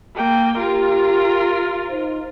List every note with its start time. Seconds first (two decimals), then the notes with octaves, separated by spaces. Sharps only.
0.15 A#3 G5
0.58 F4 G4 A#4
1.89 D#4 C5